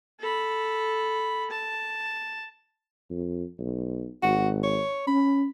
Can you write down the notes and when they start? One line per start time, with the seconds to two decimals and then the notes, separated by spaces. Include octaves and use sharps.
0.20 A4 B5
1.51 A5
3.11 F2
3.59 B1
4.23 G#1 F#4
4.64 C#5
5.07 C#4 B5